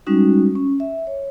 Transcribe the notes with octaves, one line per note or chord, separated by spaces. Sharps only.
G3 G#3 C#4 D#4 F#4
C#4
E5
C#5